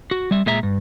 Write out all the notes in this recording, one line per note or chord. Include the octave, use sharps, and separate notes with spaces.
F#4
G3 E5
A#2 G#3 E5 A#5
G2